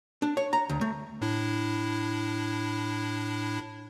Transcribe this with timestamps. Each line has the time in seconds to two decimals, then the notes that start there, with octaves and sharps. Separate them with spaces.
0.22 D4
0.37 C#5
0.53 A#5
0.69 D2
0.81 A3
1.21 A2 D4 E4